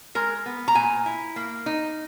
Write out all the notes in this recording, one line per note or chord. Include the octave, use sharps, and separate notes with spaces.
G#3 A#4
B3
A#5
A#2 G#5
E4
A#3
D#4